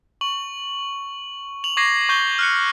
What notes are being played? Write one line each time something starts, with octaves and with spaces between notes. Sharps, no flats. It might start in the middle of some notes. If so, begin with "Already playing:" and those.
C#6 F#7
F7 F#7
C#6 D6 G#6 A#6 C7
C#6 G6 F#7 G7
F6 F#6 C#7